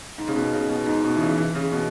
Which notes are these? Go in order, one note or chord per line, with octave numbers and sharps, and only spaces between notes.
G#2
C#3
B2
C#3
B2
G#2
B2
E3
C#3
E3
C#3
B2